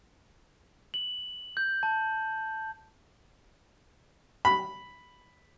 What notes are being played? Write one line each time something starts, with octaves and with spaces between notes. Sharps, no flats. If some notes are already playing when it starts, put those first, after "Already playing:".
F#7
G6
A5
B5